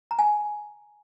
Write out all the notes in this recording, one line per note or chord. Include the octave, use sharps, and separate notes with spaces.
A#5
G#5